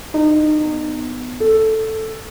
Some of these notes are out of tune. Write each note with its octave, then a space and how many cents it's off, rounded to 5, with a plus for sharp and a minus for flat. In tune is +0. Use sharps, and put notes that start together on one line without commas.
D#4 -30
B3 +10
A4 +0